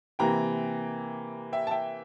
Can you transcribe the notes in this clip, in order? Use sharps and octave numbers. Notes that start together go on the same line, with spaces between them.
C3 E3 A#3 G5 A#5
E5 G5
A5
E5 G5